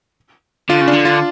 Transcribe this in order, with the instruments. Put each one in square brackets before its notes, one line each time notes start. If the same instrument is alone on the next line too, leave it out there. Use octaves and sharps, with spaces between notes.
[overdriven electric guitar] D3 [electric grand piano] F4
[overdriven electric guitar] C#3
[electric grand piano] D4
[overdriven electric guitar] D3
[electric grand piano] F4